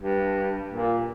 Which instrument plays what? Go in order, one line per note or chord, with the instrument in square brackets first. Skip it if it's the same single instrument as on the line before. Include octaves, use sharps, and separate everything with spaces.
[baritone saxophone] G2
A#2